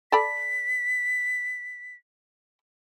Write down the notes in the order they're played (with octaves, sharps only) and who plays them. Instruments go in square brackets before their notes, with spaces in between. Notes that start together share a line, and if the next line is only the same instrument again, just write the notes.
[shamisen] A4 D5 B5 [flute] B6